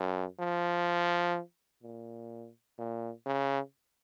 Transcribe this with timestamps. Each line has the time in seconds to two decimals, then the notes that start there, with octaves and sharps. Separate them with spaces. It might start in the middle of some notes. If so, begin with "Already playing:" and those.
Already playing: F#2
0.39 F3
1.83 A#2
2.78 A#2
3.26 C#3